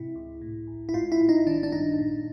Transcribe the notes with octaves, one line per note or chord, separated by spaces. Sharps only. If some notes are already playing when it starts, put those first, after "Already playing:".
Already playing: G#2 C3 E4
C#2
A2
A1
E4
G#2 F4
E4
A1
D#4
D#3 D4
D4
G2 D#4
A#2